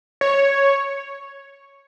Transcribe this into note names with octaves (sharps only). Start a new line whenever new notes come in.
C#5